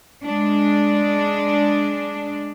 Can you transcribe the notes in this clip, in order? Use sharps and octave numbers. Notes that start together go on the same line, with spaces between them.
G#3 D4